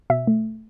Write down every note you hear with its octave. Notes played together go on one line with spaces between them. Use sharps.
B2 E5
A3